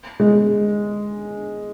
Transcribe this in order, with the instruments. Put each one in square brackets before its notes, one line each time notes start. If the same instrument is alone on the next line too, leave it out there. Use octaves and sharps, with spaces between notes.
[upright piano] G#3